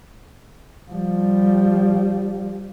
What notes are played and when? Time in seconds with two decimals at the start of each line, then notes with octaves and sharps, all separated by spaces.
0.91 F3 G3